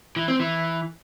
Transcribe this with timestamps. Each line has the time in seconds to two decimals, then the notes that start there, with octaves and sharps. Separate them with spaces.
0.16 E3
0.28 C4
0.40 E3